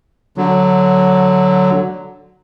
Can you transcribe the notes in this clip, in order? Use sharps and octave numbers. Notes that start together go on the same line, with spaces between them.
D3 F#3